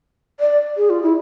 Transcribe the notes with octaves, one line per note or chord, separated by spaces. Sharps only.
D5
G#4
F4
E4